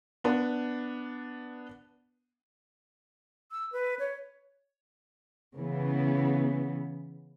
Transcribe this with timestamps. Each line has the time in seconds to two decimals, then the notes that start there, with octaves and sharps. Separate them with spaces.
0.24 B3 D4
3.52 E6
3.72 B4
3.99 C#5
5.55 C#3 E3 B3